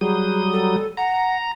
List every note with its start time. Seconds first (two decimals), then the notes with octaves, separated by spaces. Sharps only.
0.01 F#3 G3 G#4 D#6
0.53 A4
0.97 F#5 A#5